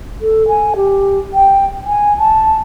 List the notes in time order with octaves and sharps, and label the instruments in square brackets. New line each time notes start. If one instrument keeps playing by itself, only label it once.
[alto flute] A4
G#5
G4
G5
G#5
A5